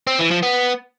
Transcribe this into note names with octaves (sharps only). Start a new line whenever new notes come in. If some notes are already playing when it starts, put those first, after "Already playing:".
C4
E3
F3
B3